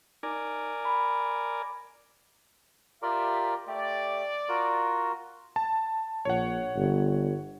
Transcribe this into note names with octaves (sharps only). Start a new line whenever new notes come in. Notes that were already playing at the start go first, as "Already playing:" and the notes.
D#4 A#4 D5 G#5
B5
F4 G4 A#4 D5 E5
A3 G4 D5
F4 F#4 A#4
A5
A#1 C#5 F#5
G1